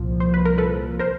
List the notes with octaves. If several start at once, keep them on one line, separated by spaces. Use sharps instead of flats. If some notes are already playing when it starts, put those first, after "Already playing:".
Already playing: C2 A#2 F3
C5
B4
A#4
A4 B4
A#4 C5